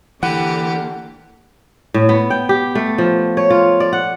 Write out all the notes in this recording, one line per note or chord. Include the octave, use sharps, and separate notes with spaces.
D3 E3 A#3 G4 F#5
A2
B3
G5
G4
A3
F3
C#5
F4
D5
F#5